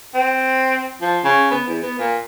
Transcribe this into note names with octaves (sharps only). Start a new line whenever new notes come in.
C4
F3
C#3
B3
E2
B3
A#2